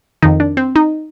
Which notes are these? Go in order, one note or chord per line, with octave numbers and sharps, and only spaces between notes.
F2 D#3 D#4
D4
C4
D#4